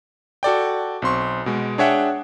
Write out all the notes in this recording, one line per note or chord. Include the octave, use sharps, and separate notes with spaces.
F#4 A4 D5 G5
B1 C4 C6 C#6
B2 G#3
D4 G#4 C#5 E5 F#5 G5